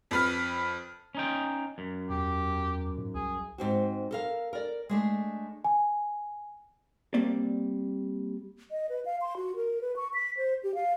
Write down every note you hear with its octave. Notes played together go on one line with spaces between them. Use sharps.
F2 B4 F6
C#4 D#4 G5
F#2
E2 G4
G#2
C2 G#4
G#2 C4 F#4
A4 A#4 F5
A#4 D5
G#3 A3 D4
G#5
G3 A#3 C4 D5
D#5
B4
F5
C6
F#4
A#4
B4
C#6
B6
C5
G4
F5